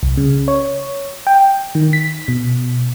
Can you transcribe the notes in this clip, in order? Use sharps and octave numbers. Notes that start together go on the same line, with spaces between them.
C2
C#3
C#5
G5
D#3
B6
B2